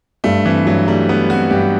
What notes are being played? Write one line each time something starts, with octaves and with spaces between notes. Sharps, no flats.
G2 A3
E3 C4
G2 F#3
G3 A3
A3 B3
C4 F#4
G2 G4